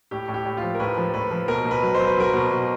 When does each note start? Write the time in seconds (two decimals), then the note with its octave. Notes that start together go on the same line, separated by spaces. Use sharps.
0.11 A2 G4
0.28 A2
0.34 G4
0.45 A2
0.57 F4
0.62 F3
0.74 A#4
0.80 A2 B4
0.97 F3
1.14 A2 B4
1.31 F3
1.48 B2 A#4
1.65 B2
1.71 B4
1.82 F#3
1.94 C5
2.00 F#3
2.07 B4
2.17 F#3 A#4
2.33 B2 B4
2.51 B2